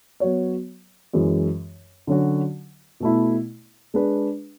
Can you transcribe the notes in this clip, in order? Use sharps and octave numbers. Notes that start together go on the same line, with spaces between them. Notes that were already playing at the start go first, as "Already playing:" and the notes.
F#3 B3 F#4 C#5
F#2 E3 G#3
D3 F#3 C#4 F#4
B2 A3 E4
G#3 D4 G#4 B4